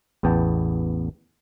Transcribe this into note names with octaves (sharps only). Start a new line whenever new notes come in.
A1 E2 B3 G5 A5